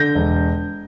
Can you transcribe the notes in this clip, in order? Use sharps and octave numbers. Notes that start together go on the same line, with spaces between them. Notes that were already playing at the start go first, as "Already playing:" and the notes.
Already playing: D3 G6 A#6
E1